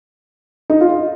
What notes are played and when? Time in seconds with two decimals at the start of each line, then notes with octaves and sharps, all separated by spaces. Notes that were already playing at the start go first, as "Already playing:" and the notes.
0.70 D#4
0.81 F4